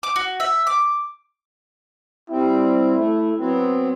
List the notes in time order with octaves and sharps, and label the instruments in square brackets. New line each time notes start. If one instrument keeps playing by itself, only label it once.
[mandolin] D6
F#4
E5
D6
[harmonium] G3 C4 [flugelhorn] E4
[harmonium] A3
F#3 B3 C4